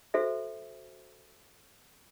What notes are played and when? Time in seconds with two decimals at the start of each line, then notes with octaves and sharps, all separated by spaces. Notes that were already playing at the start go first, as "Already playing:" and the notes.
0.14 F#4 A4 C5 E5